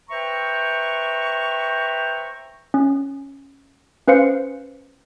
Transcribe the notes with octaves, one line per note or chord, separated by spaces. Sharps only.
B4 C5 E5 G5 A#5 C#6
C#4
C#4 B4 C5 F5 C#7